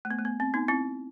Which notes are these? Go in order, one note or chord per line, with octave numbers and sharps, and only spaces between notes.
A3
B3
A3
B3
C4
B3 D#4
C4 E4